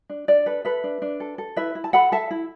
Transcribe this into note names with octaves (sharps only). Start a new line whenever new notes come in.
D4
D4 D5
A4 B4
A4 B4 E5
D4
D4
A4
A4
E4 B4 E5
E4
A5
A4 F#5 B5
A4 E5 A5
E4